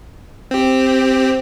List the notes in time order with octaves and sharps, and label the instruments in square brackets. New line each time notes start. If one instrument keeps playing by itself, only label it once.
[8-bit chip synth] C4 G4